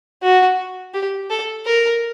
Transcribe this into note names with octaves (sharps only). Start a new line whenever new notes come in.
F#4
G4
A4
A#4